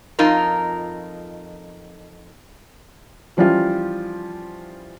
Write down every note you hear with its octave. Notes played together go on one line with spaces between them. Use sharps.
F2 D#4 F4 A#4
E3 F3 G3 C#4 F4